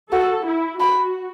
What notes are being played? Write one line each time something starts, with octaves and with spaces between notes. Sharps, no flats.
F#4 A4
E4
F#4 B5